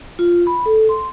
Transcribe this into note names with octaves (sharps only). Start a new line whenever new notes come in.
F4
B5
A4
C6